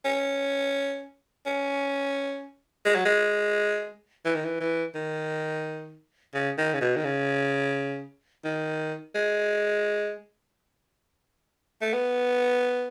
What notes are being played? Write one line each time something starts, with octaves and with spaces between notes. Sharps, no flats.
C#4
C#4
G#3
F#3
G#3
E3
D#3
E3
E3
D#3
C#3
D#3
C#3
B2
D#3
C#3
D#3
G#3
A3
B3